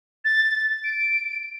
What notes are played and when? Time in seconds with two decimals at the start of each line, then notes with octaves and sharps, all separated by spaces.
0.25 A6
0.84 D7